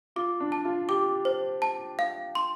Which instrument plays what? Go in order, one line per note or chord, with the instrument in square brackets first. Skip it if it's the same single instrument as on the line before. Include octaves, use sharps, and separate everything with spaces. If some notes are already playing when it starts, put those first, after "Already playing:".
[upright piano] F4 [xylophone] D6
[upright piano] D4
[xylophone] A5
[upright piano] F4
[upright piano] G4 [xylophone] D6
[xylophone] C5
A5
F5
C6